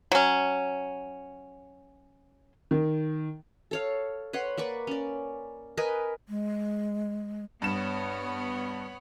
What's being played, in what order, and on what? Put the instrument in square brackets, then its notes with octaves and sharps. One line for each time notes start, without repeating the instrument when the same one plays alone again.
[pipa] F#3 C#4
[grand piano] D#3
[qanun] A4 C#5 F5
B4 C#5 F#5 C6
A#3 B4 D5 C#6
C#4 D5
A#4 B4 D#5 G#5
[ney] G#3
[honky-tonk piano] G2 E7 [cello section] B3 C#5